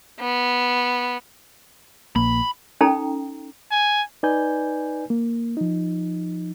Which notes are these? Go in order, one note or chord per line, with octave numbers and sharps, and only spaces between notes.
B3
A#1 A#3 B5
C#4 D#4 A4 G5 A#5
G#5
D#4 B4 D5 G#5 G6
A#3
F3 D#4